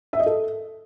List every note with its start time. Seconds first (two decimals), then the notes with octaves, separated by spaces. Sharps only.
0.13 E5
0.20 D#5
0.26 A4